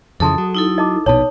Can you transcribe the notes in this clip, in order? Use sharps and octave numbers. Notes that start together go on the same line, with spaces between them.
F2 C#3 E3 G#4 A4 A5 C6 D#6
F#3
D#4 E4 A4
D#5 A5 D6
A#1 B2 D#4 C#5 A5 B5